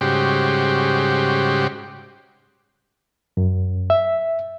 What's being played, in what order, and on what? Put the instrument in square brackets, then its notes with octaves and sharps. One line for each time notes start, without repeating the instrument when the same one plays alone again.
[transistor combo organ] G#2 C#3 G3 F#4 G4 C5
[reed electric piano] F#2
E5